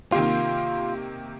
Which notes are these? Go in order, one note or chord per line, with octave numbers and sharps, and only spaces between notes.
C3 D#3 A#3 F4 G4